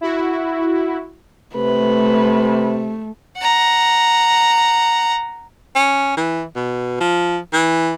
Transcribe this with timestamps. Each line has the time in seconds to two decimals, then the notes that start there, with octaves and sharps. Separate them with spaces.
0.01 E4 F#4
1.56 C3 A3 B4
3.37 F#5 A#5
5.75 C#4
6.17 E3
6.55 B2
7.01 F3
7.53 E3